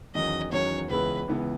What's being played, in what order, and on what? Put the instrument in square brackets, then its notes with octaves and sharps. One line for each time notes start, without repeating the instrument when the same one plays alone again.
[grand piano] E2 D#3 F#3 C#4 [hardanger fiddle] D#5
[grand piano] E2 D#3 F#3 C#4 [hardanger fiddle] C#5
[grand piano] C#2 C#3 E3 B3 E4 [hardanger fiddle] B4
[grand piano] C#2 C#3 E3 B3 E4